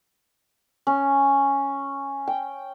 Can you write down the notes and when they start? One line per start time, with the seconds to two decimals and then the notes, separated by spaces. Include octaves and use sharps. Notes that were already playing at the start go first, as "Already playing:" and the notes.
0.87 C#4
2.27 G5